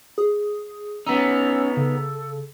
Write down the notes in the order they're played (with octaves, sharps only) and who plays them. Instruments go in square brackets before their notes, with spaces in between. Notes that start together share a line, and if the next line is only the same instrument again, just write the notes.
[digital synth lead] G#4
[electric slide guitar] B3 D#4 [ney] C#4 [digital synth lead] E6
[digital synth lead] C#3 [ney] A4